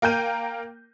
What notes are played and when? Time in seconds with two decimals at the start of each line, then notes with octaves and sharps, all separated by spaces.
0.02 A#3 A#4 G5 G6 D#7